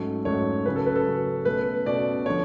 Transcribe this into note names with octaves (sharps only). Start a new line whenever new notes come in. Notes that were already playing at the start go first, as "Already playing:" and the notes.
Already playing: G#2 F#3 A3 C#4
G#2 F#3 A3 C#4 C#5
C#3 F#3 C#4 B4
A4
B4
A4
C#3 F#3 C#4
B2 A3 C#4 B4
B2 A3 C#4 D5
D3 F3 C#5